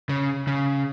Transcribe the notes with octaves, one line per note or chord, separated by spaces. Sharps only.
C#3
C#3